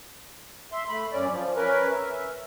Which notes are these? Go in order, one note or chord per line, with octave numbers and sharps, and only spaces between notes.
E5 C6
A3 B5
F#2 C#4 D5
F3
C#4 A#4 B4
E5